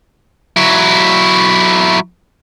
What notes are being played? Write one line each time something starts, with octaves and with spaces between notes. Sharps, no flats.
F#3 E4